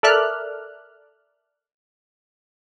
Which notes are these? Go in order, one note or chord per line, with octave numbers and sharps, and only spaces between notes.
A4 A#4 D5 E5 F6 F#6